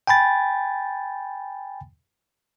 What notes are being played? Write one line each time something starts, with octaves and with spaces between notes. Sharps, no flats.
G5 G#5 B5 A6